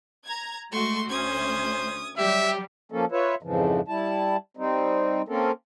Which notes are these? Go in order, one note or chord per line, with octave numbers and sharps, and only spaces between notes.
A#5 G#6
G#3 A3 F#4 C6 C#6
D2 C#4 C5 D#6 G#6
F#3 G3 G4 E5
F3 A#3 C#4 A4
F4 B4 C#5 E5
F2 G#2 C#3 E3 F3
G3 E4 A5
G3 C4 D#4
A#3 C4 C#4 A4 A#4